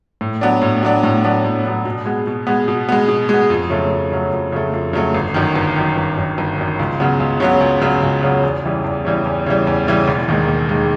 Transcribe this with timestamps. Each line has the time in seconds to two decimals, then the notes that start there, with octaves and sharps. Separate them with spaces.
0.21 A2
0.41 F#3 B3 D4
0.62 A2
0.83 F#3 B3 D4
1.03 A2
1.24 F#3 B3 D4
1.45 A2
1.65 F#3 B3 D4
1.85 B2
2.06 G#3 B3
2.27 B2
2.47 G#3 B3
2.68 B2
2.89 G#3 B3
3.08 B2
3.29 G#3 B3
3.50 F2
3.70 C#3 F#3 A3
3.91 F2
4.12 C#3 F#3 A3
4.32 F2
4.52 C#3 F#3 A3
4.73 F2
4.93 C#3 F#3 A3
5.15 G1
5.34 F#2 D#3
5.55 G1
5.76 F#2 D#3
5.97 G1
6.17 F#2 D#3
6.38 G1
6.58 F#2 D#3
6.79 C#2
7.00 C#3 F#3 B3
7.20 C#2
7.40 C#3 F#3 B3
7.60 C#2
7.81 C#3 F#3 B3
8.03 C#2
8.23 C#3 F#3 B3
8.43 E2
8.64 C#3 E3 G3
8.84 E2
9.05 C#3 E3 G3
9.26 E2
9.46 C#3 E3 G3
9.67 E2
9.87 C#3 E3 G3
10.08 E1
10.28 D#2 D#3 G#3
10.48 E1
10.69 D#2 D#3 G#3